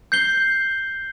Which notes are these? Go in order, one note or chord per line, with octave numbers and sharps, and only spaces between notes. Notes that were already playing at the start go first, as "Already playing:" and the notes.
G6 C7 G7